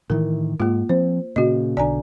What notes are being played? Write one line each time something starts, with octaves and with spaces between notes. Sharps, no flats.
A2 D#3 E3 A#4
G#2 A#3 F4
F3 C4 C5
A#2 C#3 F#4 D#5
B1 D3 D5 G#5 A#5